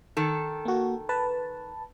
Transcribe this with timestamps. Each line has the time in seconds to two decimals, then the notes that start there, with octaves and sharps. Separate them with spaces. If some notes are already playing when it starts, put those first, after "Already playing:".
0.17 D#3 A4
0.65 A#3 F#4
1.09 B4 A5